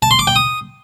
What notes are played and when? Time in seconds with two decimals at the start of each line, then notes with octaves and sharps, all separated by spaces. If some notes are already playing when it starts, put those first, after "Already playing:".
0.02 A5
0.11 C6
0.19 D6
0.27 G5
0.36 D#6